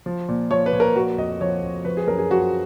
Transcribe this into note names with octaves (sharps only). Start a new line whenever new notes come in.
F3
A#2
F3 C#5
B4
A#2
A#4
F3 F#4
F2 D#5
F3 C#5
F2
F3 B4
G#4
F#2 A#4
G#4
F3 F#4